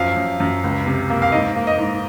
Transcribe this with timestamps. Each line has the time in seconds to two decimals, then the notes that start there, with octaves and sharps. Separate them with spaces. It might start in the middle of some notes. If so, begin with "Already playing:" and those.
Already playing: F#2 F3 F5
0.16 F#2
0.40 F#2
0.64 C#2
0.86 C3
1.10 A#3
1.22 F5
1.32 G#2 D#5
1.56 A#3
1.67 D#5
1.79 G#2